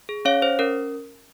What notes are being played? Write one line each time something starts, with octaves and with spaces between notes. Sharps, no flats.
G#4
C#4 C#5 F5
C#4 C5
C#4 A#4